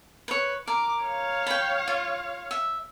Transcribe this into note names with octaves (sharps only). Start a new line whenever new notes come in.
B4 C#5
A#4 D6
C#5 F5
G5 B5
F4
E5